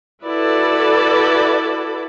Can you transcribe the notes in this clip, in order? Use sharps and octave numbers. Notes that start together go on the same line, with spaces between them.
E4 F#4 A4 B4 D5